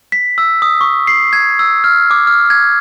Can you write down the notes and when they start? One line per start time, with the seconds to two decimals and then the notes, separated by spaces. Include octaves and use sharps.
0.12 B6
0.38 E6
0.62 D#6
0.81 C#6
1.07 C7
1.33 G#6
1.59 E6
1.84 F6
2.11 D6
2.27 F6
2.50 G#6